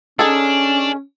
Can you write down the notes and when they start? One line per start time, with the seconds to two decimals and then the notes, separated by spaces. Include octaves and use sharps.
0.19 D#3 C#4 D4 G#4 A4